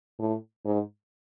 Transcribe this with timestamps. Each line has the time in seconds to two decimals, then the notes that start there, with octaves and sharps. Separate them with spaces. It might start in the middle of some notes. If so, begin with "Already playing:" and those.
0.19 A2
0.65 G#2